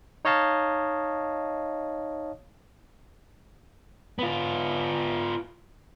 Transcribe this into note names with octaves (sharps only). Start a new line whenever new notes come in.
D#4 C#5 D#5 F5 A5
B3 F4